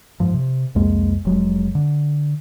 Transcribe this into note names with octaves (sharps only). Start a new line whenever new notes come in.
G#2 F3
C3
C2 F2 G#3 A#3
F1 F#3 G#3
D3